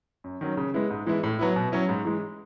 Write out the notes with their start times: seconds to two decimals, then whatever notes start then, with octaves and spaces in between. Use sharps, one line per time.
0.24 F#2
0.41 D#3 F#3 C#4
0.57 C#3
0.74 G#3 B3 E4
0.91 G#2
1.06 E3 G#3 B3 E4
1.23 A2
1.39 F#3 B3 E4
1.56 B2
1.72 F#3 C#4 E4
1.89 G#2
2.05 E3 G#3